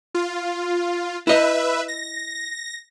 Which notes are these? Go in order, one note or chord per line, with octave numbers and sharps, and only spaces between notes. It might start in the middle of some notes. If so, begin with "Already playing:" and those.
F4
E4 B4 D#5 E5
A#6